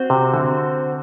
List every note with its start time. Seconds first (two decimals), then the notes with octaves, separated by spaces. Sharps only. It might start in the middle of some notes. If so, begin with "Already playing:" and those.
Already playing: C4 F#4 C5
0.10 C3
0.34 D3